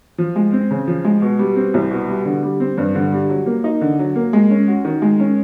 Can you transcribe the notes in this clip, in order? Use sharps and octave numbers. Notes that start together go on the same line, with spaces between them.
F3
G#3
C4
C#3
F3
G#3
B2
G3
C4
C2
B2
G3
D3
G3
C4
G2
D3
G3
F#3
A#3
D#4
D3
F#3
A#3
G#3
C#4
F#4
D#3
G#3
C#4